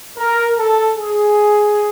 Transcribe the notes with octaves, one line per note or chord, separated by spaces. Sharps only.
A#4
A4
G#4